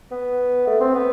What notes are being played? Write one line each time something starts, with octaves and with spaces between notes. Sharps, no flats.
B3
A3
C4
B3